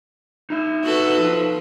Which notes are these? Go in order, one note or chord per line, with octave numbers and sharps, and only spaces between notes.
D#4 E5
F#4 A4 B4
F3